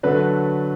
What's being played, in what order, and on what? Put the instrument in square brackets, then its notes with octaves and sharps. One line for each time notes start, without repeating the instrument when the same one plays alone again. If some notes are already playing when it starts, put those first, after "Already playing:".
[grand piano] D3 F#3 A3 B4